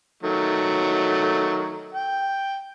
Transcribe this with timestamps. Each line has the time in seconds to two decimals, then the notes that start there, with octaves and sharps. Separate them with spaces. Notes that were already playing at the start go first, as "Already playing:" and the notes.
0.23 D#3 F#3 A3
1.95 G5